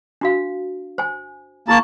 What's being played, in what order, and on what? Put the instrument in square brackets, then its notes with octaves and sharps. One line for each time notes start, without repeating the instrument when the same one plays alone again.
[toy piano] D4 F#4 F5
C5 G#5
[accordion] A#3 A5 [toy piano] E4 G#4 C#6